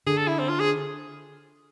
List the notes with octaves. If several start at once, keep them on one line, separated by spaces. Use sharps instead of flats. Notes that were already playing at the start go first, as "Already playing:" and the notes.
D3 G#4
A4
E4
C4
F4
G#4